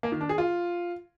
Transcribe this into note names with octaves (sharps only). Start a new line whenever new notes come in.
A#3
D#3
D4
G#4
F4